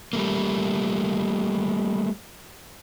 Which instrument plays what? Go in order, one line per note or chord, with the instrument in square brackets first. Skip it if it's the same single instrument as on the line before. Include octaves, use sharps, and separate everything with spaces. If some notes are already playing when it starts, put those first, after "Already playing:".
[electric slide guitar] G3 A3 A#3